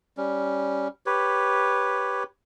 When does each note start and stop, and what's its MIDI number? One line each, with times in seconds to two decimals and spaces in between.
0.17 0.88 55
0.17 0.88 61
1.06 2.23 67
1.06 2.23 71
1.06 2.23 73